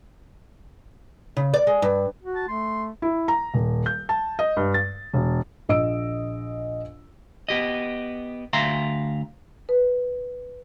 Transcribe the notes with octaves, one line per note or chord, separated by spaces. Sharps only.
C#3
D5
G#3
G2
F#4
A5
A3 C6
E4
A#5
D#1
G6
A5
D#5
G2
A6
E1
A#1 D#5 E6 D7
B3 G4 D#5
D2 E5 F5 A#5 C6
B4